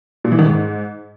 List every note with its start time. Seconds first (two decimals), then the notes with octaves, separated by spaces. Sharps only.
0.24 A#2
0.32 E3
0.39 D#3
0.46 G#2